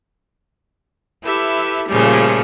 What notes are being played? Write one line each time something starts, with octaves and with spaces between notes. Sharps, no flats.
E4 G4 A4 B4 E5
A#2 C#3 F3 G3 A3